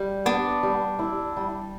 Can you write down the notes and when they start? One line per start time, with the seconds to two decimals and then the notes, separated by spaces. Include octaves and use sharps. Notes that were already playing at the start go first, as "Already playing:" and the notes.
Already playing: G3
0.26 B3 D4
0.63 G3
0.99 E4
1.37 G3